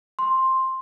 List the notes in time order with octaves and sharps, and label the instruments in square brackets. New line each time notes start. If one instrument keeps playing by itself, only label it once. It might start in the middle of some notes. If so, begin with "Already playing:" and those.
[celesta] C6